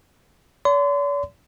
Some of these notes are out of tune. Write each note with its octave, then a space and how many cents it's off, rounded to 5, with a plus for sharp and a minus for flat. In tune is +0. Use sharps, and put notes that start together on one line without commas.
D5 -45 C6 -40